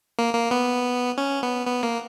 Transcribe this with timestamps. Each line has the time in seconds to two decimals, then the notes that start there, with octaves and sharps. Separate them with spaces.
0.19 A#3
0.34 A#3
0.51 B3
1.18 C#4
1.43 B3
1.67 B3
1.83 A#3